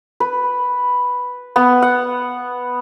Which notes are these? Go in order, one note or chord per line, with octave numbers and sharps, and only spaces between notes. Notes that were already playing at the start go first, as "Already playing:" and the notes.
B4
B3
F#5